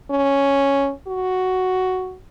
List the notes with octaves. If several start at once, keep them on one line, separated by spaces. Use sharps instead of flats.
C#4
F#4